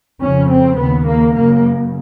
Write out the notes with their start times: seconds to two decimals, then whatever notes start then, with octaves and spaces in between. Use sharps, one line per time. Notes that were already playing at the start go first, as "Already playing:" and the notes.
0.21 F2 C#3 C#4
0.50 C4
0.79 D#2 C#3 B3
1.08 A#3
1.36 F#2 C#3 A#3